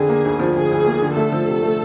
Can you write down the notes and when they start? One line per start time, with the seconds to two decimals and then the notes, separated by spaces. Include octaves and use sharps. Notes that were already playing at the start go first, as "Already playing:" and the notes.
Already playing: F2 D3 G#4
0.09 A#3
0.25 D2
0.39 F3
0.56 D2 G#4
0.71 D2
0.86 A#3
1.02 D3
1.17 A3 A4
1.32 F3
1.47 C3
1.63 A3